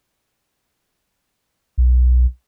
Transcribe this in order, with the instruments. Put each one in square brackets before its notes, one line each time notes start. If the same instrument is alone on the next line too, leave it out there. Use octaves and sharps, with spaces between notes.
[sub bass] B1